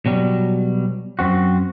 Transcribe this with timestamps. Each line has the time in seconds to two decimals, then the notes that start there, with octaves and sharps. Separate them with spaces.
0.06 B2 F#3 G3
1.19 F#2 C4 F#4